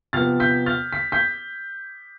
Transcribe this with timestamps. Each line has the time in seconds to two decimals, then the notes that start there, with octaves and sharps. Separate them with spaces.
0.13 C3 F3 B3 F6 A6
0.40 G6 B6
0.66 F6 A6
0.92 B6
1.12 G6 B6